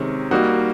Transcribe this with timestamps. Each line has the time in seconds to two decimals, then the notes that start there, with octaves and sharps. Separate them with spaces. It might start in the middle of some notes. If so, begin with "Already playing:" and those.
Already playing: C3 D#3 G#3 C#4
0.31 G3 A#3 D#4 F#4